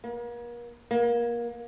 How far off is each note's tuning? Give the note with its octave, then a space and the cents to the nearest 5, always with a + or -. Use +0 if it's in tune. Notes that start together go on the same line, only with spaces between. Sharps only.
A#3 +40
A#3 +25